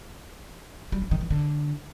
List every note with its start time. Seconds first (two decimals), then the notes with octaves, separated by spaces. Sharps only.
0.92 G3
1.02 F#3
1.11 D#3
1.21 E3
1.30 D3